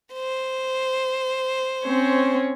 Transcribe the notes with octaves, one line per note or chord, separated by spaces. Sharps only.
C5
C4 C#4 C#5